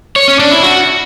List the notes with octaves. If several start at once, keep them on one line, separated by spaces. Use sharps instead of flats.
C#5
C#4
D4
E4
F#4